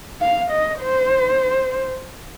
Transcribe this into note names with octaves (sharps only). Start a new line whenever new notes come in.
F5
D#5
C5